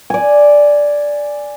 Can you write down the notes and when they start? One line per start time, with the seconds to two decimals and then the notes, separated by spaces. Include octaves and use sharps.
0.10 D5 G#5